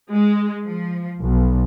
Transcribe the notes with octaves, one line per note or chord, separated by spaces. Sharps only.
G#3
F3
B1